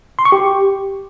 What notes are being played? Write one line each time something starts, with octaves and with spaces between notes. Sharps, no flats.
C6
C#6
G4